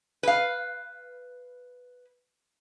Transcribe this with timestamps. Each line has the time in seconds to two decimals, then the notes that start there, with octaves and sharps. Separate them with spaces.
0.23 B4 F5